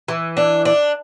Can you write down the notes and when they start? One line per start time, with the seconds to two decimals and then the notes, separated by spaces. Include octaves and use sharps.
0.08 E3
0.37 D4
0.65 D4